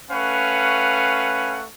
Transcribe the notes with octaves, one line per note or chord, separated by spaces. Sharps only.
A3 C#4 B4 F5 F#5